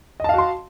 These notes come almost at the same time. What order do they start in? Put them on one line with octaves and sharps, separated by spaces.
D#5 A5 F5 F#4 C6